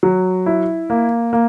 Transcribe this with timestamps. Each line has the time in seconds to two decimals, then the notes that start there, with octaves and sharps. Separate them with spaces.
0.03 F#3
0.46 E4
0.90 A#3
1.33 A#3